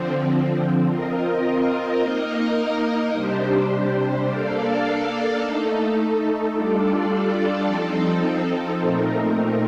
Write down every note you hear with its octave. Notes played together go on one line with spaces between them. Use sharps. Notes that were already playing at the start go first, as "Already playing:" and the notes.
Already playing: D3 F3 C4
C4 F4 A#4 D#5
A#3 D#4 A#4 D#5
C3 G3 D4 G4 C5
A#3 D4 A4 D5 F5
A3 D#4 A4
G3 D4 F4 A4 D5
F3 C4 D#4 A4
A#2 A3 C4 D#4 A#4